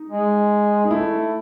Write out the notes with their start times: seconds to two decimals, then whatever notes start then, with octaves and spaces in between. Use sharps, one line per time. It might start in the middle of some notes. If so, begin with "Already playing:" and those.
Already playing: D#4
0.10 G#3
0.84 D#4
0.91 A3 E4